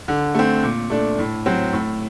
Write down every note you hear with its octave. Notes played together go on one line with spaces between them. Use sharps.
D3
A3 C4
A#2
A3 D4
A2
F#3 C4
A2